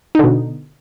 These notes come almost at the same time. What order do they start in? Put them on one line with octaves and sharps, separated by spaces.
D#4 D3 B2